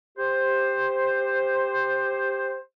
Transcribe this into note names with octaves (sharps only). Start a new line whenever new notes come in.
G4 C5